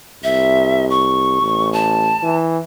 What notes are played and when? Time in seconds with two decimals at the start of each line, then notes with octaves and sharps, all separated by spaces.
0.24 C2 E5
0.90 C#6
1.42 A1
1.73 A5
2.23 E3